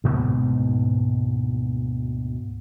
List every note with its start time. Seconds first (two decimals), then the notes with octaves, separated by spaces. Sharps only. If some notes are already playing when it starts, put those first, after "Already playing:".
0.04 D2 G#2 B2 A#3